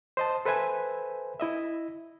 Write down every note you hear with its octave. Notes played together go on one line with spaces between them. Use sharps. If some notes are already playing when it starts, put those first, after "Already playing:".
C5 D#5 A5
A4 B4 C5 E5 G#5 B5
E4 D#5 E5